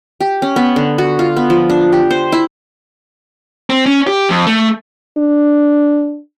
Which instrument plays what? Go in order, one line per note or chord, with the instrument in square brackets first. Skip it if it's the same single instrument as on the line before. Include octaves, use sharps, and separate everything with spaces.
[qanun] G4
C#4
B3
D3
F#4
F4
B3
F3
D4
G4
C5
E4
[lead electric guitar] C4
C#4
G4
F2
A3
[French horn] D4